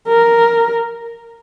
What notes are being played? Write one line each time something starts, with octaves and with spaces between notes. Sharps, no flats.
A#4